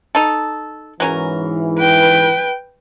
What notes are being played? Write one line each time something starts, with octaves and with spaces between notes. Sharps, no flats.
D#4 A4
G#2 E3 F#3 C#4 A#4
B4 G5